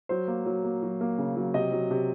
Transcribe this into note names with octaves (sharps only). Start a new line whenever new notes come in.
F#3 C5
A#3
F#3
A#3
F#3
A#3
C#3
F#3
C3 D#5
F#3
C3